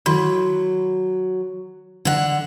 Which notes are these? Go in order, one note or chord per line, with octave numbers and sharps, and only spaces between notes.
D#3 F#3 E4 C6
D3 F#5